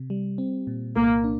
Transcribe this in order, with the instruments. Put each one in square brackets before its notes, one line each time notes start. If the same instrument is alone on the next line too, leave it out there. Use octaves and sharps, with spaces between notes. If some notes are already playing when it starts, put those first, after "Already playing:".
Already playing: [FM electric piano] C3
G3
C4
A#2
[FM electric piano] C2 [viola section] A#3
[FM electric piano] D4